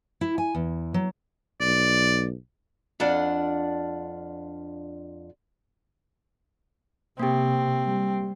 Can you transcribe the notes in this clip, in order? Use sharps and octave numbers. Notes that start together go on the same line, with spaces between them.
E4
G#5
E2
F#3
B1 D5
F2 D4 F4 D5 F#5
C3 A#3 C4 G4
G3